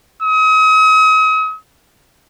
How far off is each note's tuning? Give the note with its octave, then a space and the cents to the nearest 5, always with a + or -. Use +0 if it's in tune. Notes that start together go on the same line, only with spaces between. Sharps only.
D#6 +40